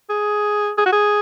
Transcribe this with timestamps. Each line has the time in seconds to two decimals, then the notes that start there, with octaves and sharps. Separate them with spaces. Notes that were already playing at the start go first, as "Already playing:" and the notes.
0.10 G#4
0.78 G#4
0.86 F#4
0.92 G#4